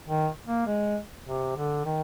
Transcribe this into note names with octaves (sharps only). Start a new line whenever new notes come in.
D#3
A#3
G#3
C3
D3
D#3